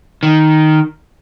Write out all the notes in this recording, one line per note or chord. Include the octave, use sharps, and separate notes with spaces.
D#3